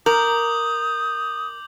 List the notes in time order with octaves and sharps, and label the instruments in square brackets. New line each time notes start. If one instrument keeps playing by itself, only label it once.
[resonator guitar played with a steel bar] A#4 [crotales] D6 G6 F#7 [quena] D#6